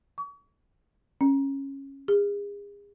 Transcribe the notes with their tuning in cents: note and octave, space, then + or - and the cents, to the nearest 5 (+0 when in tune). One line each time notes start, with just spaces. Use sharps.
C#6 +40
C#4 -15
G#4 -35